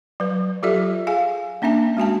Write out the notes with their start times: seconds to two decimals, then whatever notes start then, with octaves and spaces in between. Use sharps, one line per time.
0.20 F#3 B4
0.63 F#3 F4 G4 A4 D5 E5
1.07 G#4 F5 G#5
1.62 A#3 C#4 D4 E5 G#5
1.97 G#3 F#4 G#5 A5